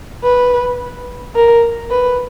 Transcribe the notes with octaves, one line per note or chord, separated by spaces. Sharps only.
B4
A#4
B4